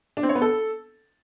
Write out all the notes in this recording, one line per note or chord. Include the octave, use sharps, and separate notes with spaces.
D4
C4
C#5
B3
A4